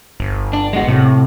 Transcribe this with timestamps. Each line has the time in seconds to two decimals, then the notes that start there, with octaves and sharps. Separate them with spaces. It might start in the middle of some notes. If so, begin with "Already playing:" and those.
0.20 G1
0.53 D4
0.73 G#3 B3 F#4
0.88 A2 C3